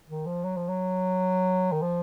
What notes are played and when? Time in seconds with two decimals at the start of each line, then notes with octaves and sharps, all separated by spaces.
0.09 D#3
0.26 F3
0.44 F#3
0.56 F3
0.69 F#3
1.72 D#3
1.82 F3